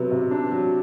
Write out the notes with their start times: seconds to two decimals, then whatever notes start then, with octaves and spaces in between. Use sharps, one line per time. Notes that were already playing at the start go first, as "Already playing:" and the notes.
Already playing: C3 F#3 B3
0.11 C3
0.31 D4
0.51 F#3